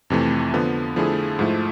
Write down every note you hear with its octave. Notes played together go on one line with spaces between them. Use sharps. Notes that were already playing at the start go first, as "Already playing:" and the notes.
F2 C3 E3 A3
D3 F3 B3
D3 F3 A3 E4 G#4
G#2 F3 A3 E4